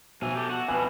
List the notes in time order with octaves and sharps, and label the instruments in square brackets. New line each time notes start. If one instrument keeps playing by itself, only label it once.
[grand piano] B2 [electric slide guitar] F3 G#5 [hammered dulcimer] E5
[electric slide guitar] G4 A4
F#4
[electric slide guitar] F2 B2 [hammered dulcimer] B4 [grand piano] G#5